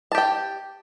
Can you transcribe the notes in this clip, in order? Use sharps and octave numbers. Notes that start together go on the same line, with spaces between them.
G4 G5 A5